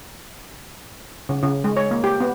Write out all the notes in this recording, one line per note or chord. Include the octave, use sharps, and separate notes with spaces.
C#3
C#3
G#3
C#5
A#3
G4
B3